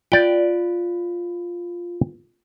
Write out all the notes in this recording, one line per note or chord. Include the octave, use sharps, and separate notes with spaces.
F4 D5 G5